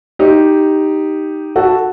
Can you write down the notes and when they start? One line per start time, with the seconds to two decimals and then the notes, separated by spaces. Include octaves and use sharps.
0.19 D#4 G4
1.56 F#4 A4